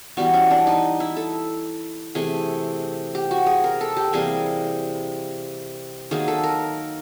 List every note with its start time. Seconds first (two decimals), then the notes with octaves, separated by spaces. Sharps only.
0.17 E3 G3 B3 F#4
0.34 C#4
0.51 D4
0.67 D#4
1.00 E4
1.17 A4
2.15 C3 E3 A3 G#4
3.15 G4
3.31 F#4
3.46 G#4
3.64 A#4
3.81 A4
3.97 G4
4.13 C3 E3 G3 A#3 G#4
6.11 D#3 F#3 A#3 G#4
6.28 A4
6.44 A#4